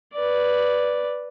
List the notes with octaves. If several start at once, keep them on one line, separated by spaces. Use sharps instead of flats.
B4 D5